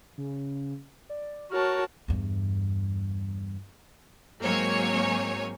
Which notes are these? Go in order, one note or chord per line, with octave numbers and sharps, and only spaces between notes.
C#3
D5
F#4 A#4 C#5 A5 F6
E2 G2
G#2 F#3 A#3 C4 C#5 G#5